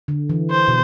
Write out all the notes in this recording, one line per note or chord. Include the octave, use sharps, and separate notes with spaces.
D3
E3
C5
B2